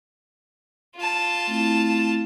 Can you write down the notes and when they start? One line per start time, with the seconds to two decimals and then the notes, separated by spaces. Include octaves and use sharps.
0.96 F4 A5
1.47 A3 C4 E4